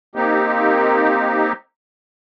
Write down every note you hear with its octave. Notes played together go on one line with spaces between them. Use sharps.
A#3 C4 D#4 G4